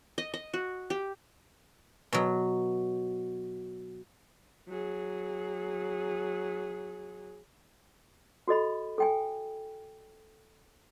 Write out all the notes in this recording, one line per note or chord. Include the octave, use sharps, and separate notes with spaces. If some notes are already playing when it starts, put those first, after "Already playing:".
D#5
D#5
F#4
G4
B2 F#3
F#3 G#4
F#4 A4 D#5 B5
A4 G5 G#5